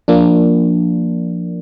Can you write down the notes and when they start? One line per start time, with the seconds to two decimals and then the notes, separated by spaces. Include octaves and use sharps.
0.08 F3 A#3 D4